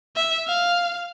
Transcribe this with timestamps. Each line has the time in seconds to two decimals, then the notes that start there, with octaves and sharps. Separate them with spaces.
0.16 E5
0.47 F5